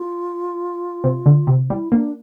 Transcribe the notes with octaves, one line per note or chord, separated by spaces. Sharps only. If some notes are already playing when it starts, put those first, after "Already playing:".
Already playing: F4
C3
D3
C3
G3 E4
A#3 D4